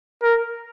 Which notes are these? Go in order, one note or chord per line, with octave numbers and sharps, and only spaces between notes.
A#4